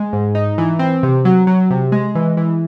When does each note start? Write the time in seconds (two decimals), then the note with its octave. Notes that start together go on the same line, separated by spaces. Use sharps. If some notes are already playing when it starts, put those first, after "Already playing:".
Already playing: G#3
0.13 G#2
0.35 D#4
0.58 E3
0.79 C4
1.03 C3
1.25 F#3
1.47 F#3
1.70 C3
1.92 G#3
2.15 E3
2.37 E3